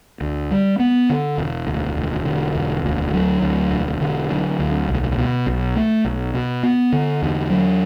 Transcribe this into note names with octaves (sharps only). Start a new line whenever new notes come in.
D2
G3
B3
D3
E1
D2
E1
D3
E1
D2
F#3
D2
E1
D3
F#3
D2
B1
B2
B1
A3
B1
B2
B3
D3
E2
F#3